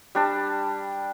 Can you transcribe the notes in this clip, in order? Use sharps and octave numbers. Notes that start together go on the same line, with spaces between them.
G3 D4 A5